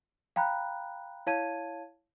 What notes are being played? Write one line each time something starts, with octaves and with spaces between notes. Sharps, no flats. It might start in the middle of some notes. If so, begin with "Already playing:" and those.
F5 G5 A#5 B5 F#6
E4 C#5 F5 A5 G#6 D#7